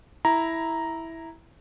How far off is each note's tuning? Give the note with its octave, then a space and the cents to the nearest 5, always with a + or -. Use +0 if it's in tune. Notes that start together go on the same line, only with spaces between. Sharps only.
E4 -5 A#5 +0